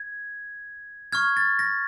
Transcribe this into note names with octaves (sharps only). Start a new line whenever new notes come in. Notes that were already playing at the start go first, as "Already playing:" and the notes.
Already playing: G#6
C#6 F6 G#6
A6
A#6